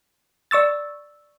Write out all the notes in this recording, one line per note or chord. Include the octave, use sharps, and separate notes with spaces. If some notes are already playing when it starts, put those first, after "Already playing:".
D5 C#6 E6 A6